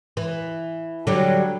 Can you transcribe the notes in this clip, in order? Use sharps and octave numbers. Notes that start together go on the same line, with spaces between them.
E3
D3 F#3 G3